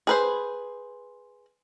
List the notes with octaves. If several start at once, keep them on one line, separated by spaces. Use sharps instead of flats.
G#4 B4 C5